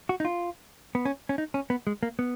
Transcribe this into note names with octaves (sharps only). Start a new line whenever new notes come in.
F#4
D#4
F4
B3
C#4
C#4
D#4
C#4
B3
G#3
A#3
B3